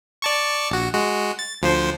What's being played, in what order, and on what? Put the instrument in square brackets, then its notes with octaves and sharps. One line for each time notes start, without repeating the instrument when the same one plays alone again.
[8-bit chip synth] D5 A5 C#6
A#1 F#4
G#3 F#4
A6
D2 F3 C5